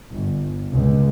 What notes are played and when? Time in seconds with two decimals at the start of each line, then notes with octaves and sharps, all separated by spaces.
0.12 G1
0.73 C#2